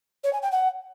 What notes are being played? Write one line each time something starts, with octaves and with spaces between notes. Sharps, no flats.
C#5
G#5
G5
F#5